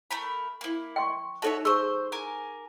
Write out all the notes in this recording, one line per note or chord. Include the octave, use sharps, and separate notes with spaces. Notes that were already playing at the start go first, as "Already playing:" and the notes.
A3 A#4 B5
A#3 E4
G5 C6 C#6
D#4 F#4 A4 C#5 E5 A5
G#4 C5 C6 C#6 E6
A#4 G#5 D6